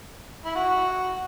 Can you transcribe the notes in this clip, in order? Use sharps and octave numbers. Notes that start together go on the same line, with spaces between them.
E4
F#4